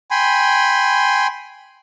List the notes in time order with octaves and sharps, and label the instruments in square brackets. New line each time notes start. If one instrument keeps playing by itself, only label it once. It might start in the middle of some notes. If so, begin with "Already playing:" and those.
[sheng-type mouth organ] G5 G#5 B5 C6